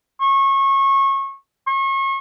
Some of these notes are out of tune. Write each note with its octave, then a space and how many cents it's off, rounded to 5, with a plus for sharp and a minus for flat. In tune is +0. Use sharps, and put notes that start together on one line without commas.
C#6 -25
C#6 -35